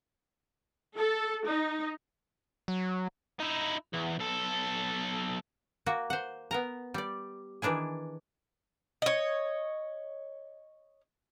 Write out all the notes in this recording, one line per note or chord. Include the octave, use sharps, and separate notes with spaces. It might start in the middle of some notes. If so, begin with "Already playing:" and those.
A4
D#4
F#3
D#4 E4
E2
B1 A4
A#3 F#4
C5 F#5
B3 A#4 A#5
G3 D5
D#3 E3 D4 E4 G#4
C#5 D#5